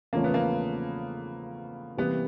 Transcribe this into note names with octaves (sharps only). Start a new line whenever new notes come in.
E2 C#3 F3 A3 A#3 C#4
B3
A#3
C3 E3 G3 A#3 B3